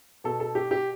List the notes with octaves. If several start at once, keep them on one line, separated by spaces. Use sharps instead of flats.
B2 A4
A4
G4
G4